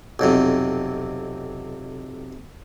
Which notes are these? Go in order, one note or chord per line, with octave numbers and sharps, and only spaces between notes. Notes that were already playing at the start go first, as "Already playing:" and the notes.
B1 F2 C3